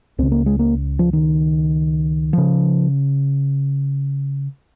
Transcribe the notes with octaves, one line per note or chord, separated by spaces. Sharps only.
C#2 C#3 C4
A#3
G#3
A#3
F3
D#3
C#3 F3